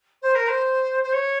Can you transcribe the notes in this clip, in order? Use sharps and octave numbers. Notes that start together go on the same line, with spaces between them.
C5
A#4
C5
C5
C#5